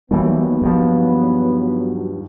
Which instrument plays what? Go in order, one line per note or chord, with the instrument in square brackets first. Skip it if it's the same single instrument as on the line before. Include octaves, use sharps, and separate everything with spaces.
[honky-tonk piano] D#2 [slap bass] E3 G3 [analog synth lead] F#3 [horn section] B3
[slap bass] G2 F3